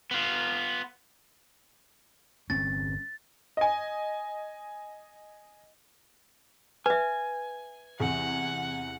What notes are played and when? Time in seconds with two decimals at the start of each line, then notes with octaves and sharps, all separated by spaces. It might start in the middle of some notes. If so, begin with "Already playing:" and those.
0.11 B3 F4
2.50 G1 C4 C#4 A6
3.57 D#5 G#5
6.86 B4 E5 G#5
8.00 E2 C3 F#5